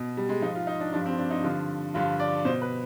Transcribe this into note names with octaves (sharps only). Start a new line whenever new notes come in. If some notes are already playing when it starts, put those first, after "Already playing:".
Already playing: B2
G3
G#3
G#2 F3 D#4
F4
D#4
D4
G2 F3 D4
C4
D4
D#4
G2 D3 F3 F4
G2 D3 F3 F4
D5
B2 C5
B4